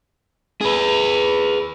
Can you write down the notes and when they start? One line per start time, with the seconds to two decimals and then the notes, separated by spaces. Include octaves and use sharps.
0.61 G#4 B4